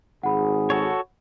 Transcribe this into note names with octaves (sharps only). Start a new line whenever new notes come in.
G#1 G#4 F#5 B5
F#4 A4 C#5